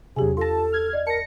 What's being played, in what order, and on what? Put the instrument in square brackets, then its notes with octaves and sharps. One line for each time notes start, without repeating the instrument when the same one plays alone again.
[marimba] E2 G4 G#5 [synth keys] C3 F#3 [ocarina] G#4
[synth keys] F4 A5 [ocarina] A4 [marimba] C6 A#6
[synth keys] F6 G#6
[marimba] D5 D#5
[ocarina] A#4 [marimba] A5 [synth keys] A#6 C#7